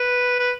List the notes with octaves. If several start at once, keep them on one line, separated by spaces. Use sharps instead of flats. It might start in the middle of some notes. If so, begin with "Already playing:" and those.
Already playing: B4
B4